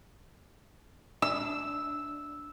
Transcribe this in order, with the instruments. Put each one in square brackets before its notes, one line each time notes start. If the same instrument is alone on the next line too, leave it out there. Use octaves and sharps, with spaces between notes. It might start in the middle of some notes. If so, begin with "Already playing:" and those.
[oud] D4 [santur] E6